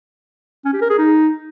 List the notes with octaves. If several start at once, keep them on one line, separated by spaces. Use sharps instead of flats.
C#4
G4
A#4
G#4
D#4